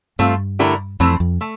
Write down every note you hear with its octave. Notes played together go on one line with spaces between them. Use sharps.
G2 A3 C4 F4
D3 A3 E4 G4 A#4
F2 E3 A3 C4
F2
A3